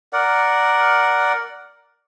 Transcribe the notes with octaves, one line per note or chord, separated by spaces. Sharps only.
A#4 D5 F#5